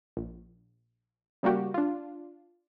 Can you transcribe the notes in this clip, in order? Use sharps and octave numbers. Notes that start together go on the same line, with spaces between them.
A#1
C#3 G3 A#3 F#4 G4
D4 F4